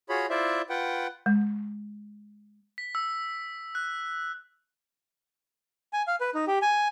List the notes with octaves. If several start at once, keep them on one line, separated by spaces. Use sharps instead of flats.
F4 F#4 G#4 C#5 B5
E4 F4 C5 D5 E5
F4 B4 F#5 G5
G#3
B6
E6
F#6
G#5
F5
B4
D#4
G4
G#5